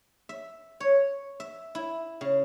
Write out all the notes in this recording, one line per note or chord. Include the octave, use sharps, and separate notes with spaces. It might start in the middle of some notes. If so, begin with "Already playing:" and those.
E5
C#5
E5
E4
C#3